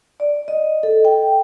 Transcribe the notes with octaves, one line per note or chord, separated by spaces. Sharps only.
D5
D#5
A4
G5